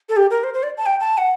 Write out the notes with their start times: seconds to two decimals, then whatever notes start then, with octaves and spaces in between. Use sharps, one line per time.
0.09 A4
0.17 G4
0.31 A#4
0.44 C5
0.54 C5
0.63 D5
0.77 A5
0.86 G5
1.00 A5
1.18 F#5